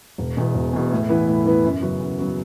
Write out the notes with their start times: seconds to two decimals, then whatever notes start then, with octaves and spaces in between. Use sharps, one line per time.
0.18 E1
0.37 E2 B2
0.55 E1
0.73 E2 B2
0.91 A2
1.09 E3 B3 E4 B4
1.28 A2
1.46 E3 B3 E4 B4
1.64 F#2
1.82 C#3 F#3 B3 F#4
2.01 F#2
2.19 C#3 F#3 B3 F#4